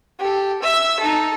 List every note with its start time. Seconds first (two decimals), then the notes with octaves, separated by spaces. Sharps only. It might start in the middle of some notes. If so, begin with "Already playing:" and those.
0.19 G4 A4
0.62 E5 E6
1.00 D#4 A4